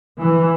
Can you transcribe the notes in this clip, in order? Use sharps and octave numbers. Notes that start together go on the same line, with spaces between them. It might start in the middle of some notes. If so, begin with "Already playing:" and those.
E3